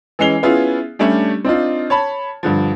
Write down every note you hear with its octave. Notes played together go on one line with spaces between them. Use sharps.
E3 G#3 C#4 C7 F7 G7
B3 C#4 E4 F4 G#4
G3 A3 C#4 D4 G4
C4 D4 D#4 F4
C#5 A5 B5
G2 D3 F3